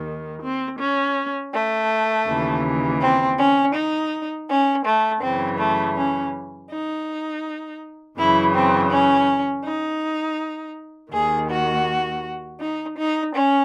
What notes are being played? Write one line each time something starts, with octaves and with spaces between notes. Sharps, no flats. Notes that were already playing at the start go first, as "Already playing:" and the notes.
Already playing: D#2 D#3
C4
C#4
A3
D#2 C#3 E3
C4
C#4
D#4
C#4
A3
F#2 C#3 E3 C4
A3
C#4
D#4
F#2 C#3 E3 E4
C4
C#4
D#4
D#2 D#3 G#4
F#4
D#4
D#4
C#4